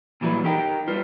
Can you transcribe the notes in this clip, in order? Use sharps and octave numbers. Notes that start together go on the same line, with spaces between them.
A#2 E3 F#3 G3 B4
D#4 G4 A#4 G5
G3 F4 B4